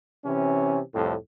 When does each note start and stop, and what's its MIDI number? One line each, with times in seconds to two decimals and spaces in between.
0.25 0.80 48
0.25 0.80 52
0.25 0.80 61
0.93 1.14 36
0.93 1.14 41
0.93 1.14 45